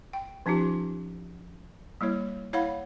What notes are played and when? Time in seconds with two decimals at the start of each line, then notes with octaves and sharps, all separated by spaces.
0.13 G5
0.46 F3 C#4 D#4 F4 G4
2.01 G3 A#3 E4 C#5
2.53 E4 C#5 F5 F#5 B5